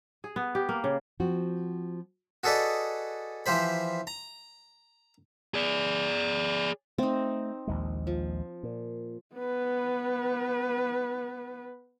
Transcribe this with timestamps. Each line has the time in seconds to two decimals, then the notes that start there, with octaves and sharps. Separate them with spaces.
0.24 G#4
0.36 B3
0.55 G4
0.69 A#3
0.84 C#3
1.20 F3 C4 F#4
2.44 F#4 G#4 A4 B4 D5 D#5
3.46 E3 F3 G4 C5 B5
4.07 A#5
5.54 G#4 D5
6.98 A3 C4 D#4
7.67 A#1 D#2 G#3
8.07 F3
8.63 A#2
9.35 B3 B4